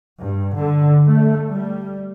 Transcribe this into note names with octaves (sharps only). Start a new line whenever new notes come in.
G2
D3
A3
G3